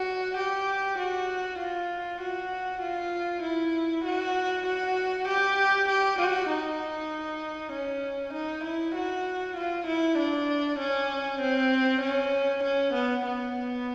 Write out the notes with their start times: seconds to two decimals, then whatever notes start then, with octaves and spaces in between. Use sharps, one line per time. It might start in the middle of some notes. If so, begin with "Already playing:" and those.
Already playing: F#4
0.38 G4
0.99 F#4
1.59 F4
2.21 F#4
2.82 F4
3.43 E4
4.05 F#4
4.67 F#4
5.28 G4
5.89 G4
6.19 F#4
6.50 D#4
7.73 C#4
8.34 D#4
8.64 E4
8.95 F#4
9.57 F4
9.87 E4
10.19 D4
10.80 C#4
11.41 C4
12.02 C#4
12.64 C#4
12.94 B3
13.25 B3